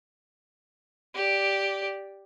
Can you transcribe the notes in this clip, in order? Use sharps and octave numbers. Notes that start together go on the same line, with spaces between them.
G4 D5